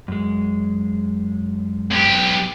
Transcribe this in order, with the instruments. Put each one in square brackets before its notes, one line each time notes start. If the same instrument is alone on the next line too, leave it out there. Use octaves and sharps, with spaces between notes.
[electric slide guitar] F#2 G#3
[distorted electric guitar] B1 G4